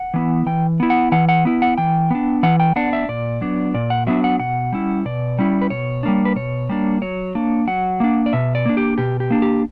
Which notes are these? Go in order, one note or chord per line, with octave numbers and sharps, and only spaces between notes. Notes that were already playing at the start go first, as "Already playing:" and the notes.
Already playing: F#5
E3 B3 E4
E3 G5
B3 E4
F#5
E3 F#5
F#5
B3 E4
F#5
E3 G5
B3 D4
E3 F#5
G5
B3 D4 F#5
E5
A#2 D5
F#3 B3 D4
A#2 D5
F#5
F#3 B3 D4 E5
F#5
B2 F#5
G3 C#4 E4
B2 D5
G3 C#4 E4
B4
B2 C#5
G3 A#3 D4
B4
B2 C#5
G3 A#3 D4
F#3 C#5
A#3 D4
F#3 F#5
A#3 D4
D5
B2 E5
D5
A#3 D4
G4
B2 G4
G4
A#3 D4
G4